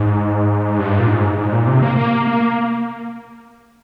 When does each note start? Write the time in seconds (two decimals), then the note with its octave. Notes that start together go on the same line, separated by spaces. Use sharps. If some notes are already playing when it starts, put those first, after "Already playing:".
Already playing: G#2
0.79 G2
1.00 A#2
1.08 G#2
1.38 G#2
1.53 A#2
1.67 C3
1.82 A#3
1.97 A#3
2.27 A#3